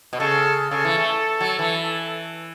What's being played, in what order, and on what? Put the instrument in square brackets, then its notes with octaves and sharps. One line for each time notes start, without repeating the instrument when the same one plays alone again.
[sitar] B2
[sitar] C#3 [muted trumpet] A4
[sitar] C#3 [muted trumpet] A4
[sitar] E3
A3
F#3
E3